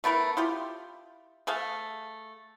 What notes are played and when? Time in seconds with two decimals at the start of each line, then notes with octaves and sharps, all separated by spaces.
0.04 A3 B3 E4 A#4
0.37 E4 F4 G4
1.47 A3 G#4 E5 F5